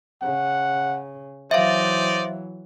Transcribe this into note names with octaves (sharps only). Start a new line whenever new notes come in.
C#3 F#5
E3 F#3 D#4 C5 D5 E5 F5